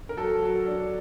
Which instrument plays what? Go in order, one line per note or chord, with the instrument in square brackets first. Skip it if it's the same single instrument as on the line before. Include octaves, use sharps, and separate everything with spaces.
[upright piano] A#4
[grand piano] F#3 [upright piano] A4
[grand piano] F#3
D4